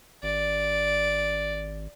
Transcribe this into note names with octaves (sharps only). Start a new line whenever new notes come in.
G#1 D5